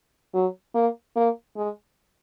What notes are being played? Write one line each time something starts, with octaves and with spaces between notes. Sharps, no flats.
F#3
A#3
A#3
G#3